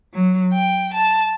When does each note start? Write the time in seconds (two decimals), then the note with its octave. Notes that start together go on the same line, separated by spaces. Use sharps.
0.14 F#3
0.53 G5
0.93 A5